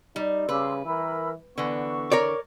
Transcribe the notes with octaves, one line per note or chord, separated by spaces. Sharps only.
G3 D#4
C#3 B4 C6 D6 E6
E3 A#4 B5 E6
D3 E3 B3 C#6
A#4 C#5 D5